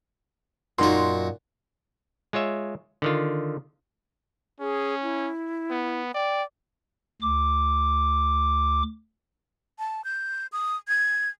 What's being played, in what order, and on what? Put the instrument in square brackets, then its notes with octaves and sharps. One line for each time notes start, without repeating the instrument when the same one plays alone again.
[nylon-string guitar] F#2 D#4 [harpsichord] A#2 F#4 [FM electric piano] C6
[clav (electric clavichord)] G#3 F4 C#5 E5
D3 D#3 F4
[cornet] C#4 [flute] G#4
[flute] E4
[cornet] B3
[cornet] D5 [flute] G5
[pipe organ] D2 D6
[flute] A5
G6
D#6
G#6